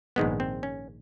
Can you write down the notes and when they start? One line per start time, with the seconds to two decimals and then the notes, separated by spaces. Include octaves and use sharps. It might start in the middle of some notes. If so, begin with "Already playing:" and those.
0.16 A#1 G#2 D#3 G#3 B3
0.40 C4
0.63 C#4